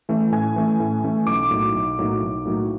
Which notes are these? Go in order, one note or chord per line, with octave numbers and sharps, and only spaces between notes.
E3 A3 C#4
A2 G#5
E3 A3 C#4
A2
E3 A3 C#4
B1 D6
A2 F#3 A#3 D#4
B1
A2 F#3 A#3 D#4
B1
A2 F#3 A#3 D#4